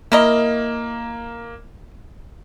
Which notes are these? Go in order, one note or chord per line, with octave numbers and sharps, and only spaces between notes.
A#3 E4 A#4 D#5